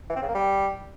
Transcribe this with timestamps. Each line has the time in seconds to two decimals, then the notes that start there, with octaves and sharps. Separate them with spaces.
0.10 E3
0.16 C4
0.22 C#3
0.28 A#3
0.35 G3